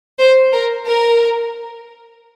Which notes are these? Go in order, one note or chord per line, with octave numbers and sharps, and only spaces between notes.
C5
A#4
A#4